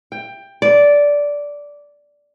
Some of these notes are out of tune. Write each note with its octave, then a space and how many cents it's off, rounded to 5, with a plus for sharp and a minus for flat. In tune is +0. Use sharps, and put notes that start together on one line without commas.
G5 +15
D5 -10